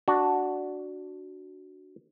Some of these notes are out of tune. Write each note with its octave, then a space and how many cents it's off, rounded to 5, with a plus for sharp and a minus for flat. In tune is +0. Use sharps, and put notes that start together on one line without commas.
D4 +0 F#4 +0